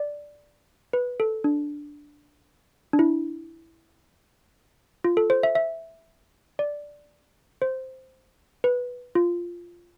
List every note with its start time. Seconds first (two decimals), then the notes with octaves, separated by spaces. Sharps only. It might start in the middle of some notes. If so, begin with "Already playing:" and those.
Already playing: D5
0.93 B4
1.20 A4
1.44 D4
2.93 D4
2.99 E4
5.04 F4
5.17 A4
5.30 C5
5.43 E5
5.55 E5
6.59 D5
7.62 C5
8.64 B4
9.15 F4